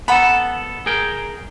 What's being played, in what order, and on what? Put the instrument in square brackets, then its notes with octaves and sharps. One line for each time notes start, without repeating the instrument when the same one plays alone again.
[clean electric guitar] B3 A4 [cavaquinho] F#5 A#5 B5
[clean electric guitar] G#4 A#4 G5